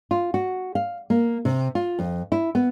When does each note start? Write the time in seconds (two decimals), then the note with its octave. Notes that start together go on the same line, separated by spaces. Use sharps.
0.11 F4
0.34 F#4
0.75 F5
1.10 A#3
1.45 C3
1.75 F4
1.99 F2
2.32 E4
2.55 B3